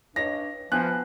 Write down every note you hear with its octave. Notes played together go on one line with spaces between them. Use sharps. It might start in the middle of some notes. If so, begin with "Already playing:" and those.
G2 C#5 D#5 A#6
F3 B3 F4 E5 G#5 F#6